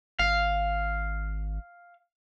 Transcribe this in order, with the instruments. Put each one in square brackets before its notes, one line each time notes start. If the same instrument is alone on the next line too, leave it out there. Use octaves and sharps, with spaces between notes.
[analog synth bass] G#1 [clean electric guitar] F5